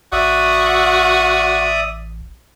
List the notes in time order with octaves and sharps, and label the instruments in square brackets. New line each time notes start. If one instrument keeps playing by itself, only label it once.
[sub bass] A1 [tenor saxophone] F#4 [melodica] D5 E5 D#6